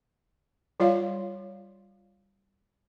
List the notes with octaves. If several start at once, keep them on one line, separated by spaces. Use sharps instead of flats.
G3 F4 C#5 F5